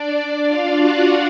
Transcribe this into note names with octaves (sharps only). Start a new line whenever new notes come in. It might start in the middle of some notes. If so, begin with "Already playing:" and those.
Already playing: D4 D5
D4 D5
F4 F5
F#4 F#5